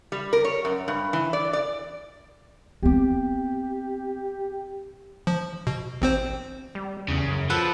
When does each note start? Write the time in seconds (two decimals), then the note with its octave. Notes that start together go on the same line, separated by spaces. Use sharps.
0.12 G3
0.33 A#4
0.45 C#5
0.65 F#2
0.88 G2
1.13 E3
1.33 D5
1.53 D5
2.82 B3 C4 G4
5.27 F3
5.67 B2
6.02 A1 C4 C5
6.75 G3
7.09 E2 C#3
7.28 F#2
7.50 F3 A4 B4 F#5